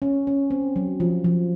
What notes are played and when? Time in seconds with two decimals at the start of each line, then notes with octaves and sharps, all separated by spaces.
0.02 C#4
0.27 C#4
0.51 C4
0.76 F#3
1.00 F3
1.24 F3